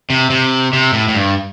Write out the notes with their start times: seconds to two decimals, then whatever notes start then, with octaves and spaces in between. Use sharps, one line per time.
0.10 C3
0.30 C3
0.73 C3
0.93 A2
1.08 A2
1.15 G2